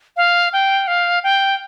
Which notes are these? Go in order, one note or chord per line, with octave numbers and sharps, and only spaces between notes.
F5
G5
F5
G5